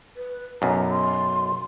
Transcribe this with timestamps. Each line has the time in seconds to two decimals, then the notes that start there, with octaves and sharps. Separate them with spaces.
0.17 B4
0.62 B1 F#2 A#5
0.91 C6